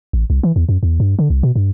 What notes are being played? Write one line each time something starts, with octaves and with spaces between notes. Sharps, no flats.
A1
C2
E3
E2
F#2
E2
G2
D3
C2
B2
G2